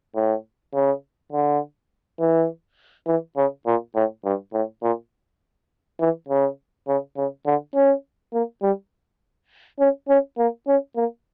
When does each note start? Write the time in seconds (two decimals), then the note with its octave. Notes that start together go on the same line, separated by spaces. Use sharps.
0.16 A2
0.73 C#3
1.32 D3
2.19 E3
3.07 E3
3.36 C#3
3.66 A#2
3.95 A2
4.25 G2
4.53 A2
4.83 A#2
6.00 E3
6.28 C#3
6.88 C#3
7.17 C#3
7.46 D3
7.75 C#4
8.33 A#3
8.62 G3
9.79 C#4
10.08 C#4
10.38 A#3
10.67 C#4
10.96 A#3